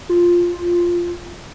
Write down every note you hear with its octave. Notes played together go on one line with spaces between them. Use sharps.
F4